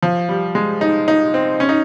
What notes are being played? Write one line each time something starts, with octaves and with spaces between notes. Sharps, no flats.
F3
G3
G#3
D#4
D#4
C4
C#4
D#4